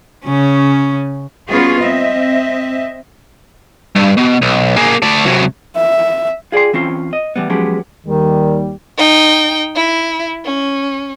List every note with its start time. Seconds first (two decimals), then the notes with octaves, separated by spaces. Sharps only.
0.25 C#3 C#4
1.49 G3 B3 C#4 F4 F#4 G#4
1.80 C4 D#5 E5
3.95 G2
4.17 B2
4.42 B1
4.77 A#3 G#4
5.03 A3 D5
5.26 C3 F#3
5.76 E5
6.52 F4 G#4 D5 G5 C6
6.73 E3 C4 C#4 F4
7.13 D#5
7.36 E3 G3 B3
7.50 F3 F#3 G#3 B3 C#4 G4
8.06 D#2 D#3 G3
8.97 D#4 G5
9.75 E4
10.45 C#4